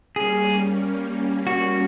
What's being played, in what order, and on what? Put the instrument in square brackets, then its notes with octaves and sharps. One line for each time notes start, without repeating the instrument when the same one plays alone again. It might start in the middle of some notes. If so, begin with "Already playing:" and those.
[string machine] G3 A#3 C#4 [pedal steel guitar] G#4
[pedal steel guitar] F#4